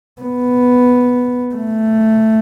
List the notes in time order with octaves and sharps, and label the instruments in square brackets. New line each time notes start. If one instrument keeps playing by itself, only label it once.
[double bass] B3
A3